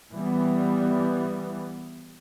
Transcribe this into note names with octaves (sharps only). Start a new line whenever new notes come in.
E3 G3 B3